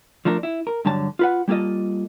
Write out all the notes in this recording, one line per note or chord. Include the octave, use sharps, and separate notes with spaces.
F3 A3 D4 A#4
E4
A#4
G2 D3 F#3 A5
F4 B4 F#5
G3 A#3 F4 A4 D#5